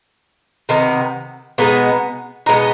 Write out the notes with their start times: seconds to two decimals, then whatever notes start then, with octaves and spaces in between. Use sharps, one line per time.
0.69 C3 D#3 B3
1.58 B2 G#3 B3 D#4
2.46 B2 G#3 B3 D#4